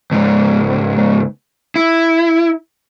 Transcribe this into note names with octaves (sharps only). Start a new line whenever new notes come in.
C#2 G#2
E4